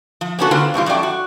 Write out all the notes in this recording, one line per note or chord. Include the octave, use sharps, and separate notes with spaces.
F3
A#3 B3 C#4 D4 F#4 A4
D3 A#3 C4 F4 B4
F#2 B2 G3 F4
F#2 F#3 A3 D5 G5
F#4